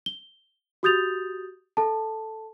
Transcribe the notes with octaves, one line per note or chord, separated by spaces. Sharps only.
G7
F#4 G4 D#6 G6 A6 F7
A4 A5